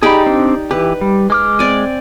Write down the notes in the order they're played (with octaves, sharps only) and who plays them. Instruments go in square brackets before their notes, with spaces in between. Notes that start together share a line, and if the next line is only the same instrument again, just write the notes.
[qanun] D#4 G4 D5 [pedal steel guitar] G#4 B5
[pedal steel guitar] C4 D4
[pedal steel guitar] E3 G4 [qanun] B4
[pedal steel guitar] G3
G#3 D6 F6
[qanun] C4 D5 G#5